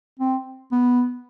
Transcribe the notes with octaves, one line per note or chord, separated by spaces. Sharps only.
C4
B3